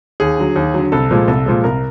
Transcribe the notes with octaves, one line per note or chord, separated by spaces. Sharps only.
D#2 G#4
D3 F#3
D#2
D3 F#3
C2 A4
A#2 F3 G#3
C2 A4
A#2 F3 G#3
C2 A#4